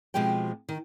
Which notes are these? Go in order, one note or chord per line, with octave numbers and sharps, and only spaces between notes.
B2 F3 G#3 C4 G4 G5
D#3